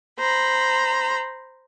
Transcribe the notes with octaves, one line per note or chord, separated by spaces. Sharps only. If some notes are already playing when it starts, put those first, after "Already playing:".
C5 A#5 B5